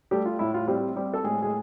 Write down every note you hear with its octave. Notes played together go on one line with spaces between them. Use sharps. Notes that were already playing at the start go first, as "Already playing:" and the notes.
G3 A3 G4
F4
A2 E4
F4
G3 C4 G4
G3 C4 G4
A4
A2 G#3 G#4
G#3 G#4